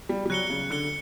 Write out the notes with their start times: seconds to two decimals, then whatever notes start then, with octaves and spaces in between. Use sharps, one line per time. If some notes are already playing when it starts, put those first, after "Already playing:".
0.09 G3
0.25 G3
0.30 F#3 F#6 C#7 G7
0.50 C#3
0.70 D3 F#6 C#7 G7